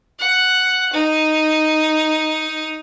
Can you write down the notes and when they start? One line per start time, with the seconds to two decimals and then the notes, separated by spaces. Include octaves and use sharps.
0.20 F#5
0.93 D#4